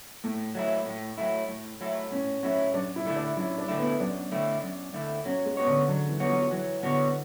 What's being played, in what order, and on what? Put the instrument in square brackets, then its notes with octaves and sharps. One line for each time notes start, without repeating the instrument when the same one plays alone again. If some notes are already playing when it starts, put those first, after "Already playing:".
[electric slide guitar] A2 [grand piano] A3
[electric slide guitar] F#3 A3 E4
A2
F#3 A3 E4
A2
F#3 A3 E4
[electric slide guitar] A2 [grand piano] C#4
[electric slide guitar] F#3 A3 E4 [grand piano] C#4
[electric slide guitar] F#2 [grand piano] D4
[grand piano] E4
[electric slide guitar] D3 A3 E4
[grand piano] D4
[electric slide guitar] F#2 [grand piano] E4
[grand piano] D4
[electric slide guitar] D3 A3 E4
[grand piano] B3
[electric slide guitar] F#2 [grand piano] D4
[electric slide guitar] D3 A3 E4
F#2
D3 A3 E4
[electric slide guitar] F#3 [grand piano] C#4
[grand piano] G#3
[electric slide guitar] B3 F#4 C#5
[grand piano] D3
[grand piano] D3 [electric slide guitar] F#3
[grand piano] E3
[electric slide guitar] B3 F#4 C#5
[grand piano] F#3
[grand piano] E3 [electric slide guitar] F#3
[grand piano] D3 [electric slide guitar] B3 F#4 C#5